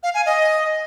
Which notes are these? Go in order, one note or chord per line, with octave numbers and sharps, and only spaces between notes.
F5
G#5
D#5